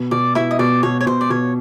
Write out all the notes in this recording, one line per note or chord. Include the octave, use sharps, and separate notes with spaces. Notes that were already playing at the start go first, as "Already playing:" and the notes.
Already playing: B2
B2 D5
B2 E4 E5
D#5
B2 D5
B2 C#5
C#5
B2 C5
D5
B2 C#5